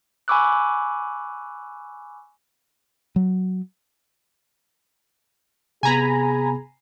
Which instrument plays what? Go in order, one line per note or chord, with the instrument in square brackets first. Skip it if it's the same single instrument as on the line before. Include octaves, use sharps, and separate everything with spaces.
[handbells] G#5 B5 C#6 D6 E6 F#6
[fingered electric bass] F#3
[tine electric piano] C3 B3 [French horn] G#4 [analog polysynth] G#5 A#5 B5